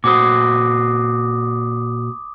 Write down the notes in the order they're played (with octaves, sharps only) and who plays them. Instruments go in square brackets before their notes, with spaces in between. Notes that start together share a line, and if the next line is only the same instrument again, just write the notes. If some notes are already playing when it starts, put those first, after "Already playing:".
[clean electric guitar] A#2 F#4 C5 [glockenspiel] D6 D#6